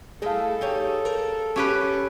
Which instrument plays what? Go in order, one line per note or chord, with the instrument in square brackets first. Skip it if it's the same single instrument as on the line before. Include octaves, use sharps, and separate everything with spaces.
[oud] A3 E4 D#5 [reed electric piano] G#4 F5 [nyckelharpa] A4
[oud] D#4 G4 C#5
A#4
[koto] C#4 G4 B4